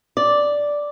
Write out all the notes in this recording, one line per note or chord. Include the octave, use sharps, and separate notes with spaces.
D5